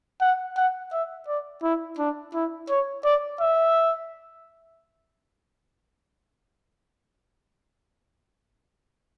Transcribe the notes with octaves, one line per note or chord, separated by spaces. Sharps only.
F#5
F#5
E5
D5
E4
D4
E4
C#5
D5
E5